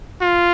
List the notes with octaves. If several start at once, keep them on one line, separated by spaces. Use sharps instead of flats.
F4